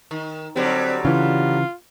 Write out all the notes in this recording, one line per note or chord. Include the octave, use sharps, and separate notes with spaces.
D#3
D3 F#3 G3 C4
C#3 E3 F4